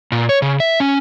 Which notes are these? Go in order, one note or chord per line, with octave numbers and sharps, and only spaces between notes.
A#2
C#5
C#3
E5
C#4